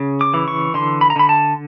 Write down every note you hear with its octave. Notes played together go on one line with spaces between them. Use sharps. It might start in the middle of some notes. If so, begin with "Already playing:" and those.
Already playing: C#3
D6
E3
C#6
D3 C6
B5
A#5
D3 B5
A5